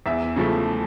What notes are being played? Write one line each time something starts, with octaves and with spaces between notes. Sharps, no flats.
E2 E5
C#3 F3 A3